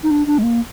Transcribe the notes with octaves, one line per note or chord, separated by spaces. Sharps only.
D#4
D4
D4
G#3
A#3